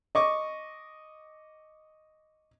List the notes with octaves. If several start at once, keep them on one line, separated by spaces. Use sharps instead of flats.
D#5 C#6 D6